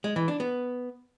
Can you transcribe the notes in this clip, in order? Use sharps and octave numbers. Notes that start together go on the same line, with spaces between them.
G#3
E3
D4
B3